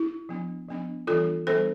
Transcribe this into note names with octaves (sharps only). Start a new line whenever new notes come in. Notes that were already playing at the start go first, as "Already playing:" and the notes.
Already playing: E4
F3 B3 D4
F3 B3 D4
E3 G3 B3 D4 F4 A4
E3 G3 B3 D4 A4 C5